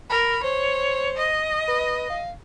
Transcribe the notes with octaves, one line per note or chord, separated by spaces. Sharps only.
A#4 B5
C5 C#5
D#5
B4
F5